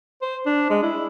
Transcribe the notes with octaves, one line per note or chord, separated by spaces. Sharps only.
C5
D4
G#3
E4